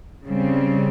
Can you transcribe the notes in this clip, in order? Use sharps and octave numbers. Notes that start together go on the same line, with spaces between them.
C#3 G3 C4